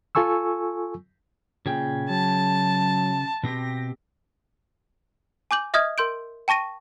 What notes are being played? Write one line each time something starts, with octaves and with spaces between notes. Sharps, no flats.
F4 A4 G#5 C#6 E6
A#2 C#3 G#4 G5
F#3 A5
B2 C4 G4 A#6
G#5 D6 G6 F#7
D#5 E5 D#6 F6 G#6
A#4 C6 G6 D7
G5 A5 C#6 A#6 D#7